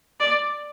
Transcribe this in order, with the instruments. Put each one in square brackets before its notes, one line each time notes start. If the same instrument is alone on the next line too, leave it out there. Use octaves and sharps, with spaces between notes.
[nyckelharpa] D5